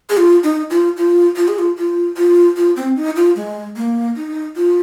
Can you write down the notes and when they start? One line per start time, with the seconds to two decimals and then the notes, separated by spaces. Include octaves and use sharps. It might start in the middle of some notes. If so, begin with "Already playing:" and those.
0.10 G#4
0.17 F4
0.44 D#4
0.70 F4
0.97 F4
1.36 F4
1.48 G#4
1.59 F4
1.77 F4
2.17 F4
2.57 F4
2.76 C4
2.96 D#4
3.16 F4
3.36 G#3
3.76 A#3
4.16 D#4
4.56 F4